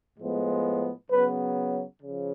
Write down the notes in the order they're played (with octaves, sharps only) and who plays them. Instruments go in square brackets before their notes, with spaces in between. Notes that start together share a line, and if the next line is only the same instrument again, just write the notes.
[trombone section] A2 F3 G#3 B3
C#3 F#3 B3 B4
C#3 F3